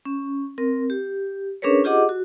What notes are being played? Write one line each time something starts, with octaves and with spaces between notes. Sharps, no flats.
C#4
C4 A#4
G4
C#4 D4 G#4 A#4 B4 C#5
F4 G4 G#4 D#5 F#5 D6
F#4